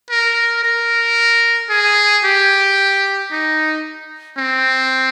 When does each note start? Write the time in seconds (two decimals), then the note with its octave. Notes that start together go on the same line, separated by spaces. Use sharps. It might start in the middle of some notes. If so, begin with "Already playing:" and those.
0.10 A#4
0.64 A#4
1.70 G#4
2.24 G4
3.31 D#4
4.38 C4